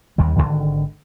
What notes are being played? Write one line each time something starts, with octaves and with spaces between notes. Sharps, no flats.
D#2 D#3 G3
G#1 B2 D3 D#3